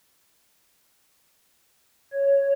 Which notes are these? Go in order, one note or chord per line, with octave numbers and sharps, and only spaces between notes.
C#5